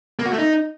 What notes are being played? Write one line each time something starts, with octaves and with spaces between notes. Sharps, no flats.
A#3
F#4
A3
D#4